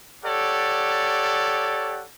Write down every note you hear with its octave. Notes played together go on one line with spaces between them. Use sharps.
G4 A4 C#5 D5 F#5